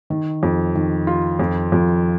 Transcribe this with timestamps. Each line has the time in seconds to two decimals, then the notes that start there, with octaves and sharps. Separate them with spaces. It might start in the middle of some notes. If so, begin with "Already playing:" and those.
0.10 D#3
0.43 F2
0.75 D#3
1.07 F4
1.40 F2
1.72 F2